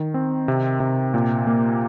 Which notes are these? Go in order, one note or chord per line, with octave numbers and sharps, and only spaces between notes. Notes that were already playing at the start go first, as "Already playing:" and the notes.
Already playing: D#3
C4
C3
C3
A#2
A#3